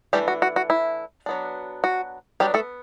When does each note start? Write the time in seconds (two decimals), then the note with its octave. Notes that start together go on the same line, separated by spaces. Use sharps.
0.13 E3 G3 A3 D4 G4
0.28 F#4
0.42 F#4
0.56 F#4
0.70 E4
1.26 F#3 B3 D4
1.84 F#4
2.40 F#3 G3 B3 D4 G4
2.54 A3 A4